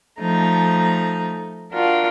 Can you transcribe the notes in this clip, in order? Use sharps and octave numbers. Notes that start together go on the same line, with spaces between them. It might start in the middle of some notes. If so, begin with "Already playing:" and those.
F3 A3 D#4 A#5
D4 F4 F#4 A#4